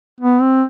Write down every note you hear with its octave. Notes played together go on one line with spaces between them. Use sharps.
B3
C4